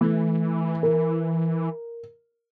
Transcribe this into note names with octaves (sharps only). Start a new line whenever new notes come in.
E3 A3
A#4